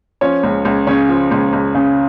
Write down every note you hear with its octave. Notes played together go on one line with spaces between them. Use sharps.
F3 C#4 C#5
C#2
C#2
C#3 C#4 C#5
F3
C#2
C#2
C#3